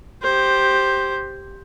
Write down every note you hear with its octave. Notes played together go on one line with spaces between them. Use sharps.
G4 C5